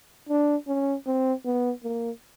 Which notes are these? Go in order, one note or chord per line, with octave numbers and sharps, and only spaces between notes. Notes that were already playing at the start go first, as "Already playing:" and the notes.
D4
C#4
C4
B3
A#3